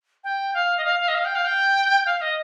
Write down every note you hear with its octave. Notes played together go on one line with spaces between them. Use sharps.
G5
F5
D#5
F5
F5
D#5
F5
G5
F5
G5
F5
D#5